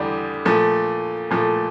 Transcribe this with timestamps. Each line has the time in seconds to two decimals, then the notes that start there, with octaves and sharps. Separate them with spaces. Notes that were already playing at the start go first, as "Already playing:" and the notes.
Already playing: E2 D3 G3 D4 G4
0.45 A#2 F3 A3
1.30 A#2 F3 A3